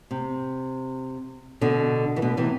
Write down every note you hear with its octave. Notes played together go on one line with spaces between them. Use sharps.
C3
B2 D3
E3
B2 D3
C3 E3